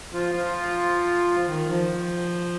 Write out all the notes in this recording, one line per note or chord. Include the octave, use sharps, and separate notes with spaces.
F3 F4
F3 F4
D#3
F3